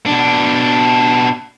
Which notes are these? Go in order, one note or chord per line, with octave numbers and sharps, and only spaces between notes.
B2 D4